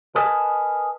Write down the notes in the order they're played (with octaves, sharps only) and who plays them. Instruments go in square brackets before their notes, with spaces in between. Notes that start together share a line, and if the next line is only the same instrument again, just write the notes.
[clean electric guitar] A#4 B4 D#5 G#5 A5